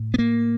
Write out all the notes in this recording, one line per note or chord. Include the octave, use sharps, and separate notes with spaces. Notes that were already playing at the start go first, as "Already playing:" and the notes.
Already playing: A2
B3
A#3